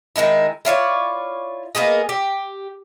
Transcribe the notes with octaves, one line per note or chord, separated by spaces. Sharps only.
D#3 G#3 D#4 E4
E4 F4 C#5 D5
A#3 B3 G#4 D#5
G4